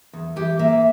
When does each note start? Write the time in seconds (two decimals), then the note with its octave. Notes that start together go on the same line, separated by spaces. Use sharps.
0.13 E2
0.36 E3 G4
0.59 A#3 E5